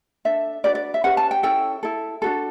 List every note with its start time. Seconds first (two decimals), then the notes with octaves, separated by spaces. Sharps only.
0.25 D4 A4 E5
0.64 D4 F#4 B4 D5
0.75 D5
0.94 E5
1.04 C#4 G4 B4 F#5
1.17 A5
1.31 G5
1.43 C#4 E4 A4 G5
1.83 E4 A4
2.22 D4 F#4 A4